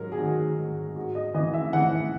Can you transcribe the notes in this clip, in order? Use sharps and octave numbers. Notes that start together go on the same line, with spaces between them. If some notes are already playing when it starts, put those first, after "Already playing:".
Already playing: G#2 F#3 A#4
G#4
D#3 F#4
G#2
G#2 F#4
D#5
E3 D#5
E5
E3 F#5